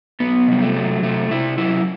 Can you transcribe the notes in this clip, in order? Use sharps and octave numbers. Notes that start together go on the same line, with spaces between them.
F#3 B3
C3 G3
A3
F#3
C3 A3
C3 E4
F#3 E4